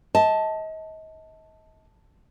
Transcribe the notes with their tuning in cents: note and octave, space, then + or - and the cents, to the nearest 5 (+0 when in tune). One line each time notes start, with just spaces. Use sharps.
D#5 +35 A5 +0